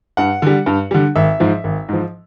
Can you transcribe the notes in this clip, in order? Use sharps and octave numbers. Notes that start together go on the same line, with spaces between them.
G2 F#5
D3 G3
G2
D3 G3
G#1 E5
G#2 F3
G#1
G#2 F3